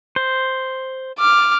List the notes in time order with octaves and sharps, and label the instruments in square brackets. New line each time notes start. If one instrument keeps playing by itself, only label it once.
[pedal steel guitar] C5
[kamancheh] D6 F6